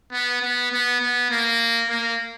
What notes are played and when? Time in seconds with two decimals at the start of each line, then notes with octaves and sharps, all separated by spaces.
0.12 B3
0.42 B3
0.72 B3
1.00 B3
1.31 A#3
1.89 A#3